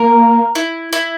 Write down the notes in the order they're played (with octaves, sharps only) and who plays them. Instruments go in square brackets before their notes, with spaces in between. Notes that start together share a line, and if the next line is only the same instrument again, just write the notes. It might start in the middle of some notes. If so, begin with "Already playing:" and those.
Already playing: [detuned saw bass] A#3 [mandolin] A#4
[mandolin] E4
E4